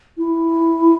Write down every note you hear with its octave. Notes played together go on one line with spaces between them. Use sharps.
E4